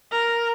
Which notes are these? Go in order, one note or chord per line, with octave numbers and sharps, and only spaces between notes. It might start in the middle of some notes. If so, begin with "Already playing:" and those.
A#4